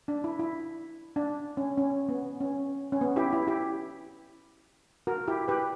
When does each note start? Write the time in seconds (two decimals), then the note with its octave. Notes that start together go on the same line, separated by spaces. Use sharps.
0.08 D4
0.24 E4
0.39 E4
1.16 D4
1.57 C#4
1.78 C#4
2.09 B3
2.40 C#4
2.92 C#4
3.01 B3
3.16 E4 G4
3.33 E4
3.47 E4 G4
5.07 F#4 A#4
5.28 E4 G4
5.48 G4 B4